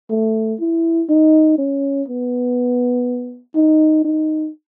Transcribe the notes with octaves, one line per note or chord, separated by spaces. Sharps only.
A3
E4
D#4
C#4
B3
D#4
D#4